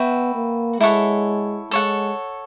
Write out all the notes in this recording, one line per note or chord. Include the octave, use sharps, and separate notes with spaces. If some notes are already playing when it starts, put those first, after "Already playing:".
Already playing: B3 F#4 B4 E5 G5
A#3
G#3 E4 A4 C#5 F#5
G#3 A4 C#5 F#5